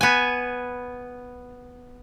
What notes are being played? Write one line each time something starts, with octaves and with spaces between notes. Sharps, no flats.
B3 G#5